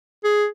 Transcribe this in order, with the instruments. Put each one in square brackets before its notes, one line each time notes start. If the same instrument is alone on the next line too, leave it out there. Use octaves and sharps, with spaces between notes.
[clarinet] G#4